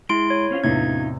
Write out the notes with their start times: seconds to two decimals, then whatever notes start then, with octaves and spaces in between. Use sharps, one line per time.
0.09 G#3 E4 C6 D7
0.30 C#5
0.51 C4 C#4 F4
0.64 E2 A2 C3 C#4 D#4 F4 G#6